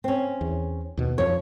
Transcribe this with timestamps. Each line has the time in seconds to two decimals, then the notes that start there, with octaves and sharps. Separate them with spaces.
0.04 C4 C#4
0.41 E2
0.97 D#2 B2
1.18 F2 F3 C#5